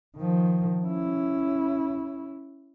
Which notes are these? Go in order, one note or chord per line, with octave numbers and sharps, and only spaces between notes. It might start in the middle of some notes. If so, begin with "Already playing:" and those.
D#3 F3
C#4 E4